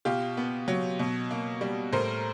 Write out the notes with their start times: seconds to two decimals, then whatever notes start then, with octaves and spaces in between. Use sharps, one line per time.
0.05 B2 F4 G4
0.37 B3
0.68 F#3
0.99 B2
1.31 A#3
1.61 G3
1.93 A2 A#4 C5